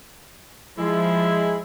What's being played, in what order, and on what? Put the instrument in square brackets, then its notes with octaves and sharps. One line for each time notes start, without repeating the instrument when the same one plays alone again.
[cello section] F3 [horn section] G#3 E4